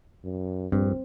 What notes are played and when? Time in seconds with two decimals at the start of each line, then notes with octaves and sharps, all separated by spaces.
0.24 F#2
0.72 A#1 G2 C4